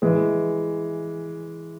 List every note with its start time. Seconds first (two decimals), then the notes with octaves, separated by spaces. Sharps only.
0.02 E3 G#3